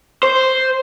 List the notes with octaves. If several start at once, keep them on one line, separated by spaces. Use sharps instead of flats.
C5